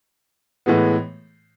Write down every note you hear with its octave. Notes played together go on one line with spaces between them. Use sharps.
A2 E3 G#3 B3